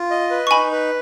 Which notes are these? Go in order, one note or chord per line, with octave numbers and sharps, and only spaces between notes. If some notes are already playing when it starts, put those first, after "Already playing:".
Already playing: F4
D#5
B4
C#6
D#4 G#5 B5
B4